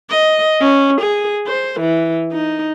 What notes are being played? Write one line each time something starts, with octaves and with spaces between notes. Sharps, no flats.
D#5
C#4
G#4
C5
E3
D#4